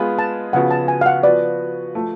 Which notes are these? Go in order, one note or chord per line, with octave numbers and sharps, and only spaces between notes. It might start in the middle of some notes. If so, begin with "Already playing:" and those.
Already playing: G#3 B3 F4 G#4 B4
A5
C#3 F3 B3 F#4 F#5
A5
G#5
F5
F#5
F3 B3 F#4 B4 D5
F3 A3